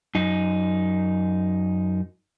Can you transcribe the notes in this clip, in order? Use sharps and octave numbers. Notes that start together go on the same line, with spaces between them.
F#2 D#4